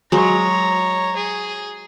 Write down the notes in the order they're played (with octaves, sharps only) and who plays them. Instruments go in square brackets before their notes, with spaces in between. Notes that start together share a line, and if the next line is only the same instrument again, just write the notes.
[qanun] F#3 G#3 [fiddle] C#5 A#5
[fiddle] G#4